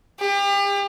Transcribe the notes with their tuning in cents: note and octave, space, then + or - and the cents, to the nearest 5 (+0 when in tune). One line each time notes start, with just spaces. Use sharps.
G4 +35